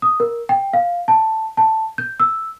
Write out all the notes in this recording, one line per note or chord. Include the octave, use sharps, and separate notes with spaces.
D#6
A#4
G5
F5
A5
A5
G6
E6